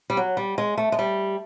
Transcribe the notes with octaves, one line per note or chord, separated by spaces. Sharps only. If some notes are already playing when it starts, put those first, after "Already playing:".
G3
F#3
G3
G#3
A3
G#3
G3